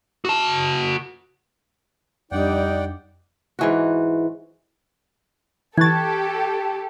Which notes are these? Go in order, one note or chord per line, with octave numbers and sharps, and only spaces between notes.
F#4 A5
F2 G3 D4 D#4 D5 F#5 G5 D6
G#2 E3 F#4
E3 G4 A4 C#6 F#6 G#6 A6